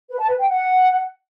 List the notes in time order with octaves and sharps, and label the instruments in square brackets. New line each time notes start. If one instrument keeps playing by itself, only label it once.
[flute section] B4
A5
B4
G5
F#5